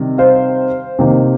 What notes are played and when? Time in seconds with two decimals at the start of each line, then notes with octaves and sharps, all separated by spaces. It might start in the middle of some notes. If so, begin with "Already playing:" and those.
Already playing: C3 D#3 G3
0.18 C5 F5
0.99 C3 D#3 A#3